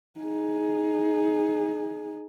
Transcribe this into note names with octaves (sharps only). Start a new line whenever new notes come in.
D#4 G#4